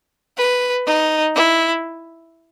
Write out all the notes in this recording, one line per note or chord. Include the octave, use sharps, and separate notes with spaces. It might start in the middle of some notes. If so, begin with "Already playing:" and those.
B4
D#4
E4